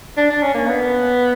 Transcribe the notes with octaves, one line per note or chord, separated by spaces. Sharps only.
D4
D4
C#4
A#3
B3